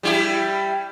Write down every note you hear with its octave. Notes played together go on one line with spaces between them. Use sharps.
G3 E4 G4